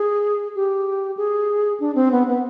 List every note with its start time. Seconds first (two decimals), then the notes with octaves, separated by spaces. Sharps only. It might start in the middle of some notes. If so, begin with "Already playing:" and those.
Already playing: G#4
0.55 G4
1.17 G#4
1.80 D4
1.95 C4
2.12 B3
2.27 B3